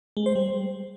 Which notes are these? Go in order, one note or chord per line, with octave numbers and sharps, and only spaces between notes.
G#3
C5
G3